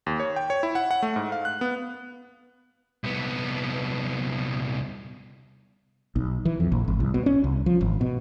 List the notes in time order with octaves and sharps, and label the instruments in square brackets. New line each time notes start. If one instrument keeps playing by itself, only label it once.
[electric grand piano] D#2
C#5
G5
C#5
E4
F#5
F#5
A3
G#2
F5
F#6
B3
[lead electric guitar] C2 B3
[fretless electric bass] B1
E3
F2
A#1
G#1
C2
B2
C#4
C2
F3
G#1
B2